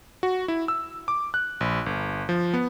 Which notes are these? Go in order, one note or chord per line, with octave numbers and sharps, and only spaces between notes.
F#4
E4
E6
D6
F#6
A#1
G1
F3
B3